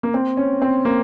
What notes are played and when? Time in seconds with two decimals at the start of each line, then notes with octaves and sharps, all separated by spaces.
0.03 A#3
0.14 C4
0.37 C#4
0.62 C4
0.85 A#3